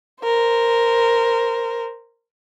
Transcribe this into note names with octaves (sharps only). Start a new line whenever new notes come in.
A#4 C5